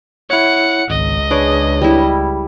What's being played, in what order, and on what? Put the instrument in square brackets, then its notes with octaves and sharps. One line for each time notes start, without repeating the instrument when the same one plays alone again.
[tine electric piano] E4 C#5 [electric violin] F#5 C#7
[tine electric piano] G#1 [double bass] C#2 [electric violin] D#5
[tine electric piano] D4 B4 C#5 [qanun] G#4 D6
[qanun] G3 E4